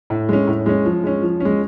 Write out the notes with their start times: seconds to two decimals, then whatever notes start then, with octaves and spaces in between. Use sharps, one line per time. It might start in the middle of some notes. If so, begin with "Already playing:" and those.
0.10 A2
0.29 G#3 C#4
0.47 A2
0.66 G#3 C#4
0.85 F3
1.04 G#3 C#4
1.22 F3
1.40 G#3 C#4